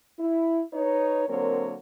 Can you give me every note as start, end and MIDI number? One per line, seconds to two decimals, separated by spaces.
0.19 0.62 64
0.73 1.26 63
0.73 1.26 71
0.73 1.26 73
1.28 1.76 50
1.28 1.76 54
1.28 1.76 58
1.28 1.76 60
1.28 1.76 70
1.28 1.76 73